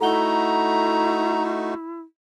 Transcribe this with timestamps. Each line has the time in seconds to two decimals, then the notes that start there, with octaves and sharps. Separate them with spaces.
0.01 A3 D#4 E4 F#4 A4 F#5 A#5 G7